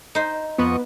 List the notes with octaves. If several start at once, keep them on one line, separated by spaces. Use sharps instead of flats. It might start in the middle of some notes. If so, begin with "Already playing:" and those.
D#4 C5
F2 B3 D#5 C#6